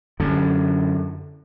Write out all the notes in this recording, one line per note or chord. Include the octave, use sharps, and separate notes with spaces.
F#2 D3